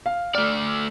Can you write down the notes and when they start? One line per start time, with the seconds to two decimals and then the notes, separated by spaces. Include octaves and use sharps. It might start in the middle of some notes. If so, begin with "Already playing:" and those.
0.06 F5
0.35 A3 D5 F6